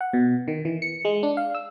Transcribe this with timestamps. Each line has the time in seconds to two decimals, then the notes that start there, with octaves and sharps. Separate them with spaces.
0.01 F#5
0.13 B2
0.48 D#3
0.65 E3
0.82 C#7
1.05 G#3
1.23 D4
1.37 F5
1.55 E6